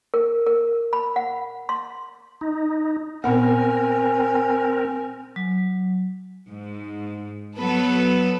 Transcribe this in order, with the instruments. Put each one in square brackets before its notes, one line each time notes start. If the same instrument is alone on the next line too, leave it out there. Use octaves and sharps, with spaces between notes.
[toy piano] A#4
A#4
B5
F#5
C6
[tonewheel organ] D#4
[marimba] A#2 B3 F#5 [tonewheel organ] C4 A#4 [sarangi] G#5
[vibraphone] F#3
[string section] G#2
F#3 B3 A4 B4